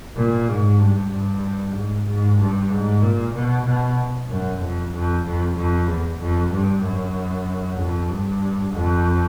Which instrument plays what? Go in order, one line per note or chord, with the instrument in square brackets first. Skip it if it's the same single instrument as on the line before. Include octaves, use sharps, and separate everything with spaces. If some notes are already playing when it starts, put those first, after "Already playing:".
[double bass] A#2
G#2
G2
G2
G#2
G#2
G2
G#2
A#2
B2
B2
F#2
F2
F2
F2
F2
E2
F2
G2
F#2
F2
G2
F2